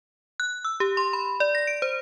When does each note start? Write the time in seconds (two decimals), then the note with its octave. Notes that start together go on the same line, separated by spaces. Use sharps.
0.40 F#6
0.65 E6
0.80 G4
0.97 C6
1.13 B5
1.40 D5
1.55 A#6
1.67 D7
1.82 C5